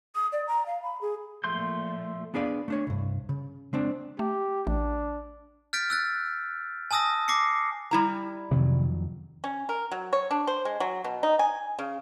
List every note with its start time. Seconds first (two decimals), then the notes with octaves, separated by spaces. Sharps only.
0.15 D#6
0.32 D5
0.47 A#5
0.66 F5
0.83 B5
1.01 G#4
1.44 A#2 F3 A3 C6 G6
2.34 B3 D4 G#4 B4 D5 F5
2.68 A3 D4 C#5
2.87 C2 G2
3.29 C#3
3.73 G#3 C4 D4
4.19 A3 G4
4.67 A1 D4
5.73 F6 G6 A6 B6 D7
5.90 E6 F#6 A6
6.91 G#5 A5 D#6 E6 A#6
7.28 D6 A#6 C7 C#7
7.91 G3 E4 A#5
8.51 F2 C3 D#3 F#3
9.44 C#4
9.69 A#4
9.91 F#3
10.13 C#5
10.31 D4
10.47 C5
10.65 G#3
10.80 F#3
11.04 B2
11.23 D#4
11.39 G#5
11.79 C#3